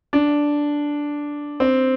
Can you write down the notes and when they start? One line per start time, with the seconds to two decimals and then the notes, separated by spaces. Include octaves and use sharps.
0.13 D4
1.60 C4